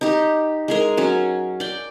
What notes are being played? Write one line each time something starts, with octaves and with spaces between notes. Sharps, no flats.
D#4 G4
G#3 G#4 A#4
F#3 C#4
D5 G5